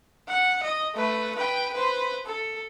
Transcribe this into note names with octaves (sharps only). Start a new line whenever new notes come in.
F#5
D#5
A3 B4
B4 G5
B4 C5
A4